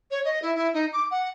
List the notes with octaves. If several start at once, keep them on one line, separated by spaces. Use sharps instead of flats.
C#5
D#5
E4
E4
D#4
D6
F#5